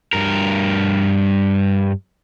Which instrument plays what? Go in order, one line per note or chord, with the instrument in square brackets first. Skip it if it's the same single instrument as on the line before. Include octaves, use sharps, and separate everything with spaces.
[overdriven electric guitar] G2 A#4